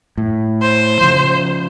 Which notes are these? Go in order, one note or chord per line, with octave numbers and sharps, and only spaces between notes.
A2
C5
C#3 F3